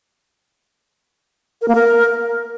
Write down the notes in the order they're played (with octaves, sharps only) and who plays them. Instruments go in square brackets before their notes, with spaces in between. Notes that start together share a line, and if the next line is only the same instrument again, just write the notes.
[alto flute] A#4
A#3
A#4